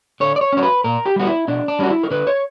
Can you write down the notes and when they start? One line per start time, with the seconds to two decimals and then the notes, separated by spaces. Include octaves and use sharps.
0.20 D3 C#5
0.36 D5
0.41 C#5
0.53 F#3 C#4 C#5
0.63 B4
0.84 A#2 A#4
1.06 G4
1.16 G3 B3 F#4
1.27 E4
1.48 B2 D4
1.68 D4
1.79 G3 C#4 F#4
1.90 E4
2.03 A#4
2.11 D3 B4
2.27 C#5